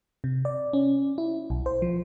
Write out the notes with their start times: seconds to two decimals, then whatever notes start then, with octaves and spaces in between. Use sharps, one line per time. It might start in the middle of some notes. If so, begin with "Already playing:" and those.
0.24 C3
0.45 D5
0.73 C#4
1.18 E4
1.50 B1
1.66 C5
1.82 F3